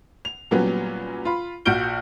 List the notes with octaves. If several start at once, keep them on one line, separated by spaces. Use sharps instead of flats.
F7
A#2 F#3 G3 B3 C#4
F4 B5
A#1 F#4 F6 G6 D7 G7